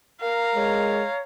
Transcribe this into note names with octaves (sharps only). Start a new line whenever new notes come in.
A#4 F5 A#5
G#3 C#5